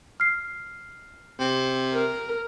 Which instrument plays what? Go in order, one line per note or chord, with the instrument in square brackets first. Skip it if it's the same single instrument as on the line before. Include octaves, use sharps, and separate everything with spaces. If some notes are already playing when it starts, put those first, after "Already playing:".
[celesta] F6 C7
[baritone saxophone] C3
[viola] A#4